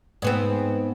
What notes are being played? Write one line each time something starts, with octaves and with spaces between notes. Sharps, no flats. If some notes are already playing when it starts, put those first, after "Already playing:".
G#2 B3 C4